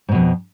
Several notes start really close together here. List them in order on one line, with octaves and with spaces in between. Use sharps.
G#2 B2 F2